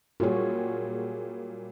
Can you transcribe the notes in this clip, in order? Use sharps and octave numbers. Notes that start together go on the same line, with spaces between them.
A#2 G3 F#4 G#4 C#5